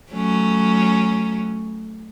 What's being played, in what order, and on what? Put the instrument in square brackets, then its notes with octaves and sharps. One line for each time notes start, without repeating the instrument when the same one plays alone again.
[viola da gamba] F#3 A3 C#4